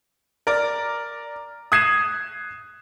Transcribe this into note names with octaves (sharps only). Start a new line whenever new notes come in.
A#4 D5
D#6 F#6 G#6 C7 D#7 E7